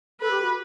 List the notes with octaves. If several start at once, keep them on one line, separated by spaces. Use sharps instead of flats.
A4 B4
G4
F#4